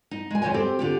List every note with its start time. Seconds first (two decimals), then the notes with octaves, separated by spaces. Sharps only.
0.11 D#4
0.30 G#3 G#5
0.42 F2 D#3 C5 C#5 D#5 G#5
0.54 C4 G4 A4 C5
0.79 D3 F4 G4